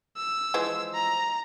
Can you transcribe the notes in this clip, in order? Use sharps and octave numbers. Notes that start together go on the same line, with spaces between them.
E6
E3 F3 G#3
A#5